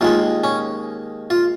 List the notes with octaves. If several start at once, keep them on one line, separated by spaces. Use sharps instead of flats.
D#2 D#3 G#3 F4
C#4
F4